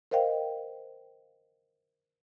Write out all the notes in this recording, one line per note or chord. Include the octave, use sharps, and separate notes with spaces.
A#4 C5 D#5 F5 G5